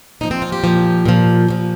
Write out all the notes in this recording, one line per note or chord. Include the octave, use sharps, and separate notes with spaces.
A#2 F3 D#4
C4
F4
G4
A#2 F3
A#2 F3
A#2 F3